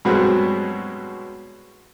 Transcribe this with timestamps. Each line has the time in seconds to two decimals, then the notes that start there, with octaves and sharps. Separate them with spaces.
0.05 G2 B2 F#3 G#3 B3 C4